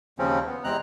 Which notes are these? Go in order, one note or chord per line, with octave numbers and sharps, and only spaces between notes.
D#2 C#3 F3 C4 C#4
B3
E2 C3 G#3 C4 A#5 F#6